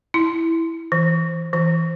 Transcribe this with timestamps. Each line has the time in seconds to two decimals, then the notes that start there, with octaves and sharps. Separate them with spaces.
0.14 E4
0.92 E3
1.53 E3